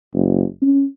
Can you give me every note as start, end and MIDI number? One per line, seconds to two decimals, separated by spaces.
0.14 0.43 30
0.62 0.84 61